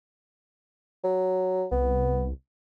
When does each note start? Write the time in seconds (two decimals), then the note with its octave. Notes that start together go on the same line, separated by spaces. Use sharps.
1.04 F#3
1.71 C2 B3